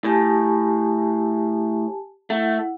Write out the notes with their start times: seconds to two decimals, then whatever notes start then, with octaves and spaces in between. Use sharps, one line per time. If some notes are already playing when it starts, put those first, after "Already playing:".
0.04 A2 G4 G#5 A5
2.30 A3 E4 F#5